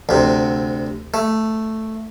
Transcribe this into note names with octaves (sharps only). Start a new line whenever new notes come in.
D2 C3
A3